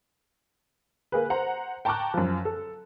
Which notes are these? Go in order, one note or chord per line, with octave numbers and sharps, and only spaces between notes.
A#3 G#4 B4
C5 F#5 A#5
G5 A5 A#5 C#6 D6 F#6
F#2 F3
A4